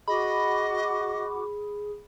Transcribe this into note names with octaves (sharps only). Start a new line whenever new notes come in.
F#4 G#4 D#5 B5 D6